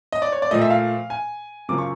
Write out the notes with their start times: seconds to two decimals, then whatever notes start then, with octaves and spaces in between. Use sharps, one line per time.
0.12 D#5
0.22 D5
0.32 C#5
0.42 D5
0.51 A#2 F3 A3 D#5
0.61 E5
0.70 F5
1.10 G#5
1.69 F#2 C#3 F3 A#3 D6
1.78 C#6